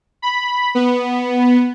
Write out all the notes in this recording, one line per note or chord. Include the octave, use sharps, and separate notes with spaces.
B5
B3